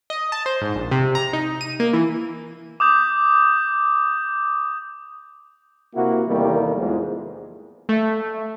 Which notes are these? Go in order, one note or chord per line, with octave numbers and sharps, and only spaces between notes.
D#5
A5
C5
G#2
A#1
C3
A#5
D#4
D#7
A#3
E3
D6 D#6 G6
C3 A#3 E4 F#4
E2 C3 D#3 G3 A3 A#3
E2 G#2 F3
A3